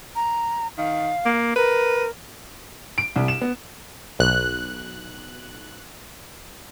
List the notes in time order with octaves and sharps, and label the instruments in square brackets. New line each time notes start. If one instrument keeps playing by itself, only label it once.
[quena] A#5
[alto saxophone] D#3 [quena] F5
[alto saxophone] A#3
[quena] A#4 [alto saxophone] B4
[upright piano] D7
C2
E7
B3
[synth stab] B1 F#6